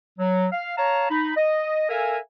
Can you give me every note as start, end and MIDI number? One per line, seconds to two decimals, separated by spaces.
0.18 0.47 54
0.52 0.74 77
0.77 1.07 73
0.77 1.07 77
0.77 1.07 81
0.77 1.07 82
1.10 1.36 63
1.10 1.36 83
1.36 1.87 75
1.90 2.18 69
1.90 2.18 70
1.90 2.18 76
1.90 2.18 77
1.90 2.18 80